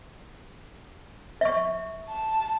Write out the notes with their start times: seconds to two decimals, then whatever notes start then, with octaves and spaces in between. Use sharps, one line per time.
1.41 E5 C#6
2.09 A5